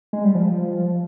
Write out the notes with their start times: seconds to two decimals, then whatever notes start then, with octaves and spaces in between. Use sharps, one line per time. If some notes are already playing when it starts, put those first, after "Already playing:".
0.13 G#3
0.24 G3
0.35 F3